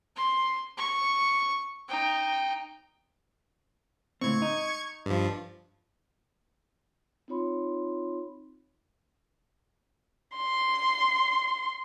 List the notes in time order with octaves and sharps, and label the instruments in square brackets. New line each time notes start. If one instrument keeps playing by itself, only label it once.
[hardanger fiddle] C6
C#6
D#4 G5
[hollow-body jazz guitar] C#2 A2 C4 [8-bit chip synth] C#6 G#6
[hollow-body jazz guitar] D#4
[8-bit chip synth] G2 F3
[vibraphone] C4 D#4 F4 C#5 B5 C6
[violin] C6